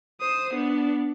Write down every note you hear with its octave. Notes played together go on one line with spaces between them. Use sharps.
C5 D#6
B3 D4